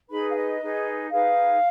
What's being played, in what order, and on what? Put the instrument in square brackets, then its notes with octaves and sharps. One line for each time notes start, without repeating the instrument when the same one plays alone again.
[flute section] D#4 G#4 B4 B5
F5
D#5
D#4 G#4 B4
D#4 G#4 B4 F5